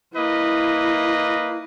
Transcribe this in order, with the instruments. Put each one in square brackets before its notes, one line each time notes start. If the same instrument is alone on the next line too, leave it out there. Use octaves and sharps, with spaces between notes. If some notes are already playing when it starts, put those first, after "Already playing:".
[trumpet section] A#3 B4 D#5 [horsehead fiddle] E4